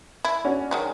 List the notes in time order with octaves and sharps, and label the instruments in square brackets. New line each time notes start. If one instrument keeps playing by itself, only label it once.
[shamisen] E4
[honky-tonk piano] C#4 D4 F#4
[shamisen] D#3 F#3 G#3